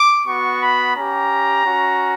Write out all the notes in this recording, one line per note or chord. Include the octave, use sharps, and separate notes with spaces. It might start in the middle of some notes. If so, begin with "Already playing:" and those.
Already playing: D6
B3 F#4 C#6
B5
C#4 G4 A#5
C#4 F#4